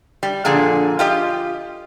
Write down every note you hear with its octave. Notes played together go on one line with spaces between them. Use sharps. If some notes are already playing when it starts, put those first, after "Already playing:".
G3
A#2 D3 F3 G#4
F4 G4 D#5